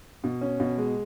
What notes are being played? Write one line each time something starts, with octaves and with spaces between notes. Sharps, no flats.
B2
C#4
B2
G#3